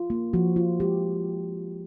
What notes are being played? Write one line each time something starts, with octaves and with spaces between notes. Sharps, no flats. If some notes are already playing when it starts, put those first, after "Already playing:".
Already playing: F4
A#3
F3 F#4
F4
G#3 G4